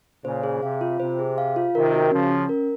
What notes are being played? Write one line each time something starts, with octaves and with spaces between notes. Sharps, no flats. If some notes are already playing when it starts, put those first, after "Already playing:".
A#2 C#3 C5
G#4
C3 F5
F4
C3 C5
G#4
F5
F4
C3 D#3 A#4
F#4
C#3 F3 C#4
C#4
A#4